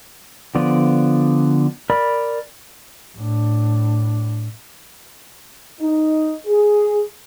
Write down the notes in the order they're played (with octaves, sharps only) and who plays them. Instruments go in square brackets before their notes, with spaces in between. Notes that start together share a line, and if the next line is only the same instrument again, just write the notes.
[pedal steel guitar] D3 F3 B3 D5
A#4 D5 B5
[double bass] A2 D4
[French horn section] D#4
G#4